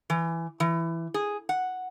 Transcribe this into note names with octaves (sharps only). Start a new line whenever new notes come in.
E3
E3
G#4
F#5